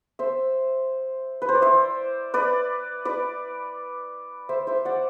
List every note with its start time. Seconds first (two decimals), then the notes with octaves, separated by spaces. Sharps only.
0.19 C5 E5
1.42 B4
1.49 C5
1.55 D5
1.62 C5 E5
2.34 B4 D5
3.05 B4 D5
4.49 C5 E5
4.67 C5 E5
4.85 D5 F#5